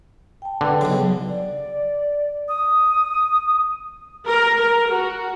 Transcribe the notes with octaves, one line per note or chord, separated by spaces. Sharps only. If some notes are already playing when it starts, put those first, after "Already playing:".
G5 A5
D3 B4 F#5 G5
B1 C#3 F#3
D5
D#6
A#4
A#4
F#4